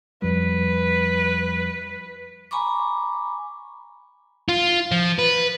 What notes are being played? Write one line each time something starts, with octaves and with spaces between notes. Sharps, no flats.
F2 F3 G3 B4
G#5 A#5 B5 C#6 D6
F4
F3
B4